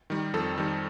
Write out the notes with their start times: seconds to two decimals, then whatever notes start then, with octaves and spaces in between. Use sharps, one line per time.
0.10 D#3 G3
0.34 F2 A4
0.58 D#3 G3